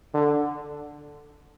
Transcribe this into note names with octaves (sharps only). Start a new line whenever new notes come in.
D3